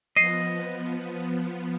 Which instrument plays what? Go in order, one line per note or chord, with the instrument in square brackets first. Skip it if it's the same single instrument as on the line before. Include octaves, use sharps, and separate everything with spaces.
[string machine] F3 B3 [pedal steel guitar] D#5 [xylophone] C7 D#7